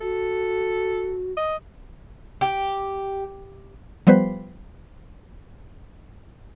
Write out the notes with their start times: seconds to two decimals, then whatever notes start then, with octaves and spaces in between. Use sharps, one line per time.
0.01 F#4 A4
1.37 D#5
2.41 G4
4.07 F3 G3 B3 B4 C5